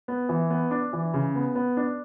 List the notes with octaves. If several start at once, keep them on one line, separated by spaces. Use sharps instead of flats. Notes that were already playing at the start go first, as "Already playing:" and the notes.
B3
E3
B3
D4
E3
C#3
B3
B3
D4